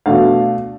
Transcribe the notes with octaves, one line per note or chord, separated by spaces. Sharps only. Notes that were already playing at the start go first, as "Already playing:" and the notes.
B2 A3 D4 F5